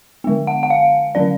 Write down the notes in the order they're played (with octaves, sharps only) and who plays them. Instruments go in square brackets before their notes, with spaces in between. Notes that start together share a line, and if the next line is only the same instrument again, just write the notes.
[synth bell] D3 G#3 B3
F#5
F#5
F5
D3 F#3 C#4 D5